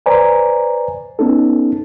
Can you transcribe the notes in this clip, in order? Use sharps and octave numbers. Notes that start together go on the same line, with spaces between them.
B4 C5 D5 G#5 A#5
B3 C#4 D#4 A4